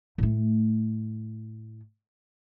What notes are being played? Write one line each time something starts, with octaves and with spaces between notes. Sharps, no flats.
A2 A3